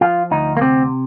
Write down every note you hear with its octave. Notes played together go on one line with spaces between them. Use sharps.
F3 F4
D2 D#4
A#3
C3 C4